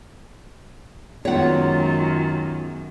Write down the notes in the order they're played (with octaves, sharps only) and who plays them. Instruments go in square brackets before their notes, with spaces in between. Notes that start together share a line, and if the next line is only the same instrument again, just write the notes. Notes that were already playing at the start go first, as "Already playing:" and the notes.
[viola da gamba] F#2 D#3 [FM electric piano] G#3 B3 C#4 [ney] F4 [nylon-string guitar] C#5 F#5